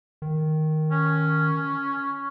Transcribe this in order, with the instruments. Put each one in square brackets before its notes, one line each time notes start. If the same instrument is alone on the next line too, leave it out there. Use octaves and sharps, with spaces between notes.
[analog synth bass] D#3
[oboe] C#4